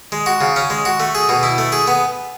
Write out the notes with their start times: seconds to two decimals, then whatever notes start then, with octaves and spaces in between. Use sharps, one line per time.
0.12 G#3
0.26 F#4
0.41 C#3
0.56 C#4
0.70 G#3
0.85 F#4
1.00 A3
1.15 G#4
1.29 B2
1.43 E4
1.58 A3
1.72 G#4
1.87 B3